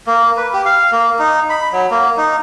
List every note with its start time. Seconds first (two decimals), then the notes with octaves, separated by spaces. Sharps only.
0.07 A#3
0.37 B4
0.53 G4
0.65 F5
0.92 A#3
1.19 D#4
1.50 B5
1.72 F#3
1.91 A#3
2.17 D#4